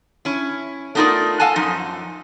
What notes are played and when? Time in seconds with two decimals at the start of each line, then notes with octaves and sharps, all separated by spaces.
0.25 C#4 E4
0.95 A3 B3 D#4 F4 A#4 D5
1.39 A4 F5 F#5 G#5 A5
1.56 F#2 F3 D#4